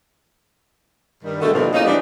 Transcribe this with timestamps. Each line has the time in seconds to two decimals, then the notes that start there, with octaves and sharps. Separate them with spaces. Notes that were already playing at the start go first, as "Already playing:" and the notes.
1.24 G2 D#3 G3
1.41 B2 D3 D#3 G#3 A3
1.53 D#2 G#2 B2 D3 E3 F3
1.73 E2 A#3 C#4 D#4
1.85 E3 G3 B3 D4